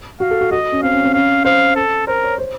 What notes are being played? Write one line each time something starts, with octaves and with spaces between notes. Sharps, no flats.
F#4 F5
A4
F#4
F#4 D#5
C#4
C4 F5
C#4
C4
C#4 F5
C5 F5
A4
A#4 C5
C#5
C5